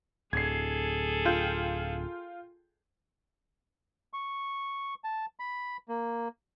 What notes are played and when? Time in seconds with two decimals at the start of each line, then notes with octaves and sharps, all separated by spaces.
0.33 D1 G#4 A4 G#6 C7
1.25 F4 G5 G6
4.13 C#6
5.04 A5
5.39 B5
5.88 A#3